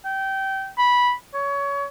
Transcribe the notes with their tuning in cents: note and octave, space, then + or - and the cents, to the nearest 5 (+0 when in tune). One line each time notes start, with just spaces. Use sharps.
G5 -20
B5 -10
C#5 +25